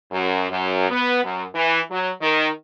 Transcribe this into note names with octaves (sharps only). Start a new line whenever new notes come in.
F#2
F#2
B3
F#2
E3
F#3
D#3